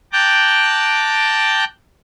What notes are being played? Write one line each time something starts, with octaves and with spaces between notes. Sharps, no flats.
G5 A5 A#5 D6 F#6 G6